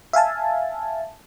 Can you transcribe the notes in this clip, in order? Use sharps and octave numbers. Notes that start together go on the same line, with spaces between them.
E5 F5 G#5 A5